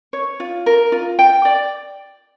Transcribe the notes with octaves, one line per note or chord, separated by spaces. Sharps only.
C#5
F4
A#4
F4
G5
D5